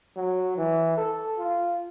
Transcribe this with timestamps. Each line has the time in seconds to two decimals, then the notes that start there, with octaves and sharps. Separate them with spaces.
0.16 F#3
0.57 E3
0.97 A4
1.38 F4